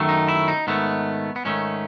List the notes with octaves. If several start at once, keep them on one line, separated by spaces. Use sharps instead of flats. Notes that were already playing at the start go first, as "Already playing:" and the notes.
Already playing: F#2 D#3 F#3 A3
D#4
E4
D#4
G#2 D#3 A3 B3
B3
G#2 D#3 A3 C#4